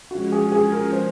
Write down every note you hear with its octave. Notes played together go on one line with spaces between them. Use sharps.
F3 G#3 C#4 F#4
G#4
G#4
A#4
C5